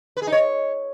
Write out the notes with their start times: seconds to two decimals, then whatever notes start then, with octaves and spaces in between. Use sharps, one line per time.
0.17 B4
0.22 G#4
0.27 D#4
0.32 C#5